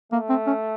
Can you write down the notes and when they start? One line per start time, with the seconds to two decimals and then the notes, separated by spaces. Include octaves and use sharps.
0.12 A3 A#3
0.29 C4
0.47 C#4